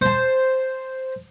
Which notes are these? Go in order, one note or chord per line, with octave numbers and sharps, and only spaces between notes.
C5 A5